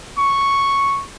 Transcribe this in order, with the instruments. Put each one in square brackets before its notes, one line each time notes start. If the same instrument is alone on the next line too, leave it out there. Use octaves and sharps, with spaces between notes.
[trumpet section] C#6